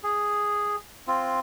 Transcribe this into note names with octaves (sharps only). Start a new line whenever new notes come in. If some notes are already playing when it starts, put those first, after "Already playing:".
G#4
C4 F4